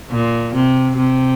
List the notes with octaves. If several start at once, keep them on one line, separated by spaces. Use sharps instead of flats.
A#2
C3
C3